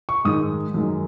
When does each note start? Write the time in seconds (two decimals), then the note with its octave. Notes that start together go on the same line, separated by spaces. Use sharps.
0.09 C#6
0.25 G#2 D#3 G#3 D#4 D#6
0.74 F#2 D#3 G#3